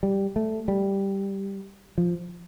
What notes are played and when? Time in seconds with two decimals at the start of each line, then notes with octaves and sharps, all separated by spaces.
0.03 G3
0.36 A3
0.68 G3
1.98 F3